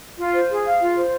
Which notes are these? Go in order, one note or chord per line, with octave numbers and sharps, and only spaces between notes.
F4
C5
G#4
F5
F4
C5